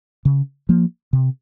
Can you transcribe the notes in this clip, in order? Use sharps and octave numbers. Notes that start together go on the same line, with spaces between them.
C#3
F3 A#3
C3